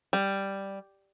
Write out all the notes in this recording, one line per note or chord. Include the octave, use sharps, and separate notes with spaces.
G3